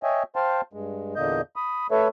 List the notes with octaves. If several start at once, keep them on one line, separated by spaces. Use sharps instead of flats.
C#5 D#5 E5 G5 G#5
C5 F5 G5 A5 C6
G2 G#3
E2 A#2 D3 A#3 D#5 G6
B5 D#6
A3 A4 B4 C#5 E5